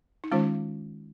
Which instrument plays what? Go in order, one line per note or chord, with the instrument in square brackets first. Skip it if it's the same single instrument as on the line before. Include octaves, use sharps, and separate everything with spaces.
[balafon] D#4
D#3 G#3 C#4 F4